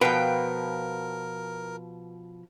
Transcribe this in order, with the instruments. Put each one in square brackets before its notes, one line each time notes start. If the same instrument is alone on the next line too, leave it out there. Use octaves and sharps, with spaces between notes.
[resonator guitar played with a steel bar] B2 [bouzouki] F3 G5 [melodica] A#4 [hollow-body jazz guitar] B4